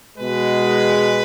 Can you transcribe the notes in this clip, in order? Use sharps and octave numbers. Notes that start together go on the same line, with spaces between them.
B2 G#3 B4